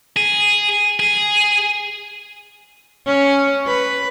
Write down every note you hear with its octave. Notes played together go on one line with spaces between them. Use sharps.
G#4
G#4
C#4
B4